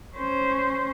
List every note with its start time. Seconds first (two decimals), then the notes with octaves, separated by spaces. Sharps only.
0.16 C#4 C5